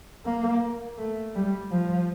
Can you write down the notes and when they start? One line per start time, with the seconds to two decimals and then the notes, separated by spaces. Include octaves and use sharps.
0.26 A#3
0.98 A3
1.35 G3
1.71 F3